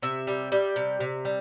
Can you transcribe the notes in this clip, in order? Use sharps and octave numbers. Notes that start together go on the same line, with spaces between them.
C3 E5
G3
G3
C3
C3
G3